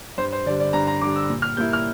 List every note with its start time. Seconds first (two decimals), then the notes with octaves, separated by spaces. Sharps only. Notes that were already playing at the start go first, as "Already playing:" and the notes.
0.18 G2 C5
0.32 C5
0.46 D3 D5
0.49 G3
0.60 D5
0.73 G2 A#5
0.87 A#5
1.01 D3 G3 D6
1.16 E6
1.30 A#2
1.42 F6
1.56 G3 A#3 E4 G6
1.73 F6